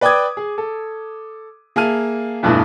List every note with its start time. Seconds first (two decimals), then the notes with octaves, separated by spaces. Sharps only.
0.01 B4 D5 G5 D6 D#6 G#6
0.37 G#4
0.58 A4
1.76 A#3 G#4 E5 A5 F6 D#7
2.43 E2 G2 B2 E3 A3